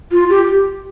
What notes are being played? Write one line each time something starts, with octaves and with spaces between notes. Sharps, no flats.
F4
G4